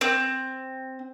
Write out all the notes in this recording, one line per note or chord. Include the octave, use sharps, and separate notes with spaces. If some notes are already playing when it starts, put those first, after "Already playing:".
C4